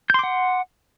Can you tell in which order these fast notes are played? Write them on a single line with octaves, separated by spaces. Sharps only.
G6 C6 D6 F#5